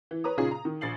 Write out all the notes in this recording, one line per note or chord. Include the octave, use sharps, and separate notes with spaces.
E3
B4 C#5 A#5 D#6
A#2 C#3 C#4 D#4 F4 G#4
A#5
D#3
A#1 A6 C7 F#7